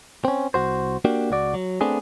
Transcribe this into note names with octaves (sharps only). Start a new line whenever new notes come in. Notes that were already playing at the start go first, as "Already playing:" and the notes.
C4 C#4
C2 F#4 C5
A#3 D4 F#4 G4
C#2 F#4 D5
F#3
A3 B3 C4 D4 G#4